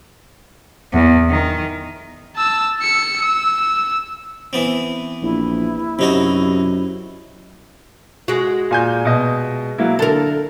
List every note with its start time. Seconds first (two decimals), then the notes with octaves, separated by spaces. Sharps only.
0.93 E2
1.29 D#3
2.36 A5 E6
2.80 E6 C#7
3.22 E6
4.53 E3 B3 C4
5.22 A#1 E4
5.99 F#2 C3 D#4 F#4
8.28 G#3 F#4
8.71 A#2 G#5 G6
9.05 B2 D#5
9.78 F#3 A#3 E4
9.99 D3 A4 A#4